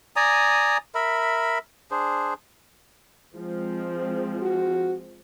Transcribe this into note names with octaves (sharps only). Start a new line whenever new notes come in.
D5 G#5 A#5 D#6
A#4 E5 B5
D4 G#4 C5
F3 G#3 C4
F#4